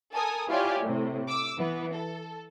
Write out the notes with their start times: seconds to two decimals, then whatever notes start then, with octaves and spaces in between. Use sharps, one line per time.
0.13 A4 A#4 G#5 D#6
0.48 E4 F4 G4 C#5 D5 G#5
0.82 A2 C3
1.27 D6 E6
1.57 E3 B3
1.93 A4